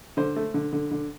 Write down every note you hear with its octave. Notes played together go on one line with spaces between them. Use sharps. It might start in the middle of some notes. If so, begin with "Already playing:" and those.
D3 C5
A3
D3
D3
D3